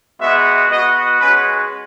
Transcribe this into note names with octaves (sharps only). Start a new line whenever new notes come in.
G#3 B3 F#4 E5
B3 F#4 D#5
G#3 C#4 F#4 B4